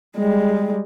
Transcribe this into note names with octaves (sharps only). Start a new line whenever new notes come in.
G3 G#3